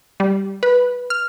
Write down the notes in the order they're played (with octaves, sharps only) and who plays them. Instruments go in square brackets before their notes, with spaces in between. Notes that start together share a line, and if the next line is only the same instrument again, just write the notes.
[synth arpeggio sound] G3
B4
F6